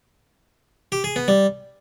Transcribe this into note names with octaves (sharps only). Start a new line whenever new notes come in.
G4
G#4
B3
G3